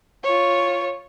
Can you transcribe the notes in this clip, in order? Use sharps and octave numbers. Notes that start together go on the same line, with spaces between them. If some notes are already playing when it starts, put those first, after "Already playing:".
F4 C#5